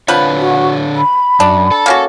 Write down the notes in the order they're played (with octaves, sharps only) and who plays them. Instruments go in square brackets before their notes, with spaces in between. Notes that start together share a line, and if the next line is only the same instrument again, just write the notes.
[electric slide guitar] D3 D4 C#5 [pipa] F3 B3 B4
[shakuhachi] F#4
B5
[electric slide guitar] F#2 [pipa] D4
[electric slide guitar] A4 A5
[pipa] A#3 C#4 F#4